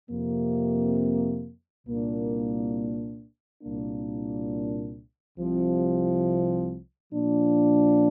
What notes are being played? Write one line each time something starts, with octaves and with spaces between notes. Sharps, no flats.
F2 C3 A#3
C2 A#2 A#3 D4
C2 A#2 A#3 D4
C2 C3 F3 C4
A#2 F3 D4